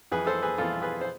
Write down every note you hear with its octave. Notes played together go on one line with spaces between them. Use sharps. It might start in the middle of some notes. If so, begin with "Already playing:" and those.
F2 E3 G#4 B4
A4 C5
G#4 B4
F2 E3 F4 A4
G#4 B4
C5